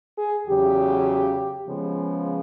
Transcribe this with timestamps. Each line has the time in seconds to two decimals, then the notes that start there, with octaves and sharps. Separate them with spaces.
0.16 G#4
0.46 E2 C#3 F#3 G4
1.68 C#3 F3 G#3 B3